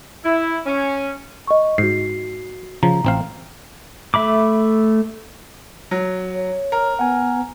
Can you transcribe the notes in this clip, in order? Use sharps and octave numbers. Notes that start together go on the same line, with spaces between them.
E4
C#4
D#5 C#6
G#2 F#4 C7
C#3 F3 A#5
A1 C4 F5
A3 E5 B5 D6
F#3
C#5
A#4
B3 F#5 G#5